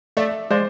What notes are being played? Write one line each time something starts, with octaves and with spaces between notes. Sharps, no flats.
A3 D5 E5
G#3 C5 D5